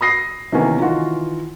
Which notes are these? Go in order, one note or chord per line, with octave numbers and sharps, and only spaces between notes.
B5 D#6 A#6 C7
C3 D#3 E3 A#3 B3 C#4
D#3 E3 F4 F#4